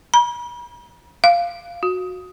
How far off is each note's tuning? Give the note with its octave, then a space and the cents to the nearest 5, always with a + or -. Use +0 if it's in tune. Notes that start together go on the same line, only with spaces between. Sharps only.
B5 -45
F5 -10
F#4 -15